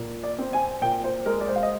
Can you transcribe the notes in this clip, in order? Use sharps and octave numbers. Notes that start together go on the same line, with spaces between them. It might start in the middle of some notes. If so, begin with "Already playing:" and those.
Already playing: A#2
D5
C4
G#5
A#2 G5
C5
G#3 A#4
D5
C5
F5
D#5